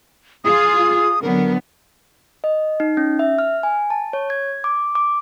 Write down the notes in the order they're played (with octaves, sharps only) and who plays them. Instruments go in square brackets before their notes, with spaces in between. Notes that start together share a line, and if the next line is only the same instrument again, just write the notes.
[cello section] F4 G#4 [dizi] D#6
[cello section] D3 F#3 B3 [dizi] A#4
[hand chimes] D#5
D#4
C#4
E5
F6
G#5
A5
C#5
G#6
D6
D6